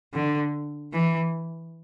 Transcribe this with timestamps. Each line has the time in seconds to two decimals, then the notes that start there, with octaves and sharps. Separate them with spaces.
0.14 D3
0.93 E3